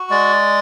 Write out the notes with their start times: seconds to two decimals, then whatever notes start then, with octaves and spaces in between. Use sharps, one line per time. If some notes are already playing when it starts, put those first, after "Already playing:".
Already playing: F#4
0.10 G#3 D5